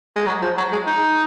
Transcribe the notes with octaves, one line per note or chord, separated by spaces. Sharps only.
G#3
F#3
F3
F#3
G#3
D#4